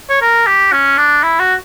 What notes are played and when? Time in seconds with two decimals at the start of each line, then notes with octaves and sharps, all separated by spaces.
0.09 C#5
0.22 A#4
0.47 G4
0.72 C#4
0.98 D4
1.23 E4
1.40 F#4